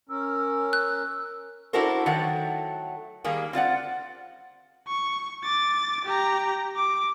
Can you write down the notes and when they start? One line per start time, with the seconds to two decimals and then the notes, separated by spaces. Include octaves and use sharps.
0.09 C#4 A#4 E6
0.73 F#6
1.73 D4 E4 F#4 A4 A#4 C5
2.06 D#3 F#3 A3 F#5
3.24 D#3 G3 A#3 G#4
3.53 C4 F4 D5 F#5
4.88 C#6
5.44 D6 A6
6.05 G4 A#5
6.76 D6